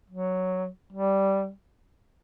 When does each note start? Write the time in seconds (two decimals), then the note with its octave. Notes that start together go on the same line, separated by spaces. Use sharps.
0.10 F#3
0.92 G3